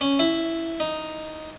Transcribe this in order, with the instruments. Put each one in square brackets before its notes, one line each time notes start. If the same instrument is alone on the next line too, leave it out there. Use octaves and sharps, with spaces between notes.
[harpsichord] C#4
E4
D#4